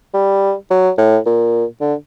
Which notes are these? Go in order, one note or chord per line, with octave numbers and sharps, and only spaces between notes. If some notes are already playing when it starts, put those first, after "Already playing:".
G3
F#3
A2
A#2
D3